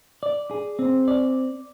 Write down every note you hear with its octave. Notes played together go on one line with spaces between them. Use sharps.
D5
G#4
C4
D5